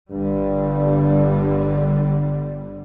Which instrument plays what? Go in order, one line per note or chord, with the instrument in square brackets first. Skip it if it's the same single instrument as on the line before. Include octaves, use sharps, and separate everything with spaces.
[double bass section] G1 D3 G3 [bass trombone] G2